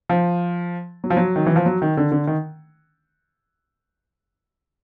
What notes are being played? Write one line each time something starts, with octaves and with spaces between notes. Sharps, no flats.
F3
F#3
F3
F#3
D#3
E3
F3
F#3
D#3
D3
D3
D#3